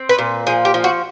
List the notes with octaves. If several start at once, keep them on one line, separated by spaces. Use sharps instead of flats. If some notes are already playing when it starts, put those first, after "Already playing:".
Already playing: C4
B4
A#2
F3 G#4
G4
F3
F#4